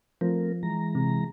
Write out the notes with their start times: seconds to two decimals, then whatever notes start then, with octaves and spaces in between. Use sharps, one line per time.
0.21 F3 A3 C4 A#4
0.63 E3 G#3 A#5
0.95 C3